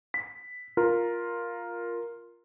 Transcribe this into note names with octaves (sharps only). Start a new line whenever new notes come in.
B6
F4 A#4